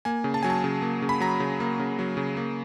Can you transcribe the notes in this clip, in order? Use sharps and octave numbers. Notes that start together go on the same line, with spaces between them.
A#3 G#5
C#3
A5
F#3 G#5
A5
C#3
A#3
C#3
B5
F#3 A#5
C#3
A#3
C#3
F#3
C#3
A#3